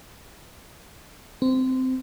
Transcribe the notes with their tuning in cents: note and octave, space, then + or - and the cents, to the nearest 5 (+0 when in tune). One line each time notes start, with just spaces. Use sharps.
C4 -15